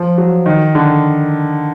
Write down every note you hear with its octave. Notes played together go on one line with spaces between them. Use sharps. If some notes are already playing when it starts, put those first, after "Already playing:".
Already playing: F3
F#3
D#3
D3